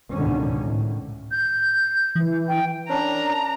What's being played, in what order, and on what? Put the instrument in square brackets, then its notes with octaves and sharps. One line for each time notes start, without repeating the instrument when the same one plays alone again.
[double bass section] C#2 G#2 B2 D3 D#3 C#4
A2
[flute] G6
[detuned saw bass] E3
[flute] G5
[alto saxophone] C#4 [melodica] D4 [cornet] A#4 [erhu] A#5